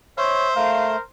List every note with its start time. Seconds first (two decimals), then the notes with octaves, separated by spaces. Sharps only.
0.18 C5 C#5 E5
0.56 A3 A#4 F5